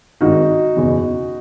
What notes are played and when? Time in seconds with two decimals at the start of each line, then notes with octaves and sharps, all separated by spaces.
0.21 G#1 G#2 D#3 D#4 F#4
0.76 F#1 E2 B2